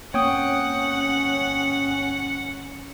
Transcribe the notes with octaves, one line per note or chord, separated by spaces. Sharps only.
G1 A#3 C4 C#4 C#5 F#5 G5 D#6